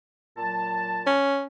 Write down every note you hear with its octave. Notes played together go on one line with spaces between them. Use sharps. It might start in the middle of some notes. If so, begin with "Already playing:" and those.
A#2 F#3 A5
C#4